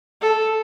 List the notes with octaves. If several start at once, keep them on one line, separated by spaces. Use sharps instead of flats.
A4